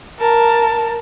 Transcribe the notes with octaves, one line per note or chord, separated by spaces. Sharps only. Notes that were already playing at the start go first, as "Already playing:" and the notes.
A#4 A5